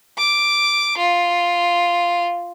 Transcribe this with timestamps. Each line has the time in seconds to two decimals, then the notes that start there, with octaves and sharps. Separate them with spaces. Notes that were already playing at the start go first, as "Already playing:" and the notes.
0.18 D6
0.98 F4